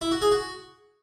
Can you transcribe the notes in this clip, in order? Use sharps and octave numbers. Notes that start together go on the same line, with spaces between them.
E4
F#4
G#4
F#4